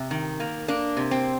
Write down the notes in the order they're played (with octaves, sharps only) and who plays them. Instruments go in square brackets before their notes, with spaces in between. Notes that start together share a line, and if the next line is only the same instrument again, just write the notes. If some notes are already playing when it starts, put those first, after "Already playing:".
Already playing: [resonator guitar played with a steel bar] C3
D#3
A#3
A#3 D4
C3
C4